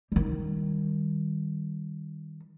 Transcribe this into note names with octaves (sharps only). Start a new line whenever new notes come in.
D#3 G3